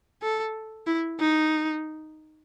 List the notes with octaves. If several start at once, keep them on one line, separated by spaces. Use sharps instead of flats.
A4
E4
D#4